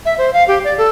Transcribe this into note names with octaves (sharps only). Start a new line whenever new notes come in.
E5
C5
F5
G4
D5
A4